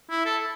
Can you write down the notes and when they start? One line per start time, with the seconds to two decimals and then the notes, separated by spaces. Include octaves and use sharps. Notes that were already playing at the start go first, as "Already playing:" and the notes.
0.10 E4
0.25 A4